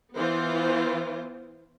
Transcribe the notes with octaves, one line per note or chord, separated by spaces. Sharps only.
E3 B3 F4 C5